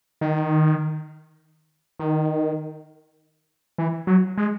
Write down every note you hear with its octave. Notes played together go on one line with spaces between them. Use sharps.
D#3
D#3
E3
F#3
G#3